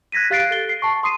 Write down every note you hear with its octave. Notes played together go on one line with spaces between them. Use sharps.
F#6 G#6 A#6 B6 D#7
G4 F5 F#6 A6 C7 D7
A4 A6 G7
C7
A5 C#6
C6 D#6 C7 D#7